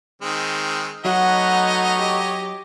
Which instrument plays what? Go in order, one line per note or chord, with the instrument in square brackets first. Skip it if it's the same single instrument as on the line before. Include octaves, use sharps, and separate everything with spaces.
[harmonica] D#3 G#3 C4
[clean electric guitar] F#3 [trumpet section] A3 B3 D#4 [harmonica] C#5 D#5 [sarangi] F#5
[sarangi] G4